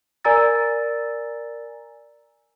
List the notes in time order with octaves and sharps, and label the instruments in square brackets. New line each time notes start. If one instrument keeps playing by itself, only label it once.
[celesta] A#4 D5 G#5 A#5 E6 A6